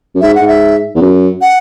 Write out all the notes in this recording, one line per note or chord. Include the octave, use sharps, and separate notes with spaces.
F#2
G#2 E5
F#5
G#2
E5
E2
F#2
F#5